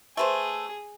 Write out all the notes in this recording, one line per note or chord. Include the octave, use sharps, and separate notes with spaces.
A3 G#4 B4 C5